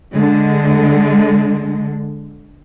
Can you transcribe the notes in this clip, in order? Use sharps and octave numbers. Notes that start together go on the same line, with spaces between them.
D3 G#3